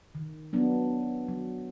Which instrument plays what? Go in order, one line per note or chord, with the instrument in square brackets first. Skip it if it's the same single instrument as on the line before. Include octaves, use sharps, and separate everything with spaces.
[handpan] D#3
F#3 B3 D4
F#3